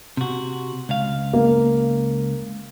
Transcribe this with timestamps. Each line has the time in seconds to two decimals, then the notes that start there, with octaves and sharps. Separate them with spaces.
0.17 C3 F#4
0.89 C#2 F5
1.34 A#3